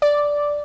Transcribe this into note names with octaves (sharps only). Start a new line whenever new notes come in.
D5